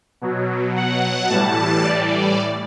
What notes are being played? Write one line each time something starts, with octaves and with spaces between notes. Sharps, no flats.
B2 F#3
F#5
A2 E3 G3 A5
D5